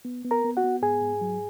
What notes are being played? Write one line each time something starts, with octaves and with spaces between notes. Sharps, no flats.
B3
B3
A#4 A#5
B3
F#4 F#5
B3
G#2 G#4 G#5
G#2
F#3